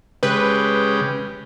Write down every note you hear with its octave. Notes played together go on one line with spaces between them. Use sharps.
C#3 G#3 G4 B4